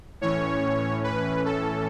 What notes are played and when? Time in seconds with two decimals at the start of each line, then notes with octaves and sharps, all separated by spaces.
0.21 A2 E3 C#4 C#5
1.04 B4
1.45 A4